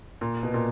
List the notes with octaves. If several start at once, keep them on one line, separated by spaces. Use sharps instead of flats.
A#2
B2
A#2